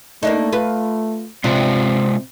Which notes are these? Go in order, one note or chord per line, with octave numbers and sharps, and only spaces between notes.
A3 A#3 D4 D#4
F4 B4
C3 G#3 C4 D4 F4 E5